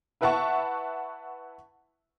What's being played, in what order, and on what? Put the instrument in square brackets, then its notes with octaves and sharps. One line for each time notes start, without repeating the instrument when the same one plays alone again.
[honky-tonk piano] E4 B4 E5 F#5 A5 C#6